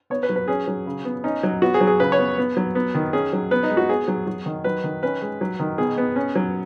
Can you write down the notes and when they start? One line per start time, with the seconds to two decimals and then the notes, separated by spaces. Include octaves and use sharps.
0.10 B3 C#5
0.23 B4
0.29 F#3
0.36 B4
0.48 C#4 G#4
0.67 F#3
0.86 C#3
1.05 B3
1.24 C#4 D#4
1.43 F#3
1.62 B3 F#4
1.74 G#4
1.81 F#3
1.87 G#4
2.00 C#3 B4
2.12 C#5
2.19 B3
2.38 B3
2.57 F#3
2.75 B3
2.95 D#3
3.13 C#4 G#4
3.33 F#3
3.51 B3 B4
3.63 D#4
3.70 G#3
3.77 F#4
3.89 B3 G#4
4.08 F#3
4.27 F#3
4.46 D#3
4.64 F#3 B4
4.84 D#3
5.03 C#4 B4
5.22 G#3
5.41 F#3
5.59 D#3
5.78 B2 G#4
5.98 B3
6.16 C#4
6.35 F#3